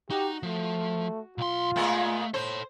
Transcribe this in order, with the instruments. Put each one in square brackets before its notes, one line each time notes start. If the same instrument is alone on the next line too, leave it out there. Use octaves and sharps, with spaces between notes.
[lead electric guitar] D#4 [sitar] F#4 [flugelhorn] G4
[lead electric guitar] F3 [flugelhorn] A3
[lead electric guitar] B1 C6 [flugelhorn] F4
[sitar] A#2 G#3 B3 [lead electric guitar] A3
[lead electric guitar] A4 C#5 [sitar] C5